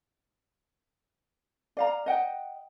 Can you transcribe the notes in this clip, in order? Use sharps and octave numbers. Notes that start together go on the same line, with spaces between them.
D5 F5 A#5
D#5 F#5 G5